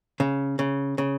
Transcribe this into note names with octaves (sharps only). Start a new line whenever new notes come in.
C#3
C#3
C#3